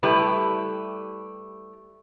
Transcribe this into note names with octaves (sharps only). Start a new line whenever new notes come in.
G3 A3 E4 G4 B4